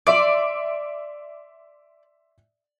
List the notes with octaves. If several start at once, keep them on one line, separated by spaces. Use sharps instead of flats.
D5 E5 C6 D6